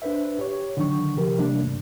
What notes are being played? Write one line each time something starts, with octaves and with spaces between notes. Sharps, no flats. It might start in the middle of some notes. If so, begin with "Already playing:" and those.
D4 B4 C5 E5
G4 C#5
D3 D#3 F#3 D4 C#6
C3 F3 G4 A#4
C3 E3 G3 A3 A#3 D4
D2 G2